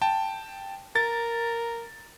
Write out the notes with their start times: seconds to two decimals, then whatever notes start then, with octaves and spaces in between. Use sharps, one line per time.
0.02 G5 A5
0.96 A#4 A6